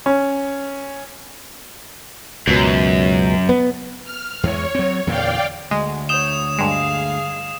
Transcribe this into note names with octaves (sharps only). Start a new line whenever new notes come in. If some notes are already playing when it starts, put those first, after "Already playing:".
C#4
C#2 F#2 B2
B3
F6
E2 E3 G#3 C#5
F#3 C4
E2 A#2 D3 D5 F5 G5
D2 G#3
C#5 D#6 G6 E7
G2 G#3 G#4 F5